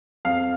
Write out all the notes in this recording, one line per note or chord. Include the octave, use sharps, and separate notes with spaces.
F2 F5